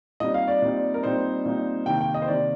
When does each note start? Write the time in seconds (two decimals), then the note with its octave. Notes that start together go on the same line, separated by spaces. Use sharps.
0.20 A#2 G3 C4 D#4 D#5
0.34 F5
0.48 D5
0.62 A#2 G3 C4 D#4
0.94 A#4
1.03 A#2 G3 C4 D#4 C5
1.45 A#2 G3 C4 D#4
1.86 C3 D#3 A#3 G5
2.01 G5
2.14 D#5
2.22 C5
2.28 C3 D#3 A#3 D5